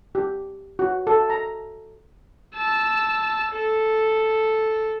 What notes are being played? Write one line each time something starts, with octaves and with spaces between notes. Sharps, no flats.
G4
F#4
A4
A#5
A5 E6
A4